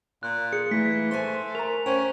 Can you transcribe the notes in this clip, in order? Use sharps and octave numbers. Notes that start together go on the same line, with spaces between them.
A#2 F#6
G#4 C#7
E3 A3 B6
A3 C5 G#5 C6
A#4 A#5 F7
C#4 C5 G5